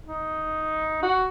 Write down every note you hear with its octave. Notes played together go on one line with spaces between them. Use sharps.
D#4
F#4